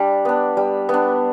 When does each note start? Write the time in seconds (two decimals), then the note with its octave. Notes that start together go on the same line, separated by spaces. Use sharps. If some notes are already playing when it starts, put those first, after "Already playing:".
Already playing: G3 D4
0.25 B3 D4
0.57 G3
0.89 B3 D4